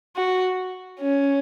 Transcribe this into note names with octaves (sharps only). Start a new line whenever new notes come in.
F#4
C#4